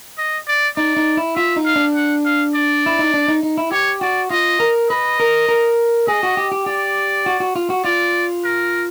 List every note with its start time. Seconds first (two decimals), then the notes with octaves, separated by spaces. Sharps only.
0.18 D#5
0.48 D5
0.77 D#4 D5
0.97 D#4
1.17 E4
1.36 F4 E5
1.56 D#4
1.65 F5
1.76 D4
1.95 F#5
2.25 F5
2.55 D5
2.86 E4
2.99 D#4
3.14 D4
3.28 D#4
3.43 D#4
3.58 E4
3.71 G4 C#5
4.01 F#4 D5
4.30 F4 D#5
4.60 A#4
4.90 B4 D#5
5.20 A#4
5.49 A#4
6.07 G#4 D#5
6.23 F#4
6.37 G4
6.52 G4
6.66 G4 D5
7.26 F#4
7.40 F#4
7.56 F4
7.70 F#4
7.84 F4 D5
8.44 A#4